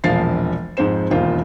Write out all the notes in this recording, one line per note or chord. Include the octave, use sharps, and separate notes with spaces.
E1 A#1 F3 F5 A6 C7
F2 G#2 C4 C5 E7
E1 D#2 F4 C5